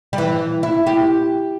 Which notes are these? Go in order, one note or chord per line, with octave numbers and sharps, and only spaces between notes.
G3
E3
E4
G4